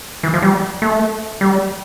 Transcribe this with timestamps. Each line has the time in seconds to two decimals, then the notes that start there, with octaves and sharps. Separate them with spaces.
0.23 E3
0.34 F3
0.42 G3
0.82 A3
1.41 G3